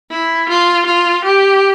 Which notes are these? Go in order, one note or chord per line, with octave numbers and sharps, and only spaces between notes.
E4
F4
F4
G4